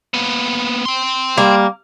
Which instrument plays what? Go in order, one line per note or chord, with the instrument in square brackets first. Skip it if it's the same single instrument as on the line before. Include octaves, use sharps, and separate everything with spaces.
[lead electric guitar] A#3 B3
G5 C6
[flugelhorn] G3 [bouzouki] A#3